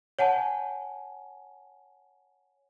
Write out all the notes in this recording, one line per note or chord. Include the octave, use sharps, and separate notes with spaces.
C#5 F#5 G#5 A5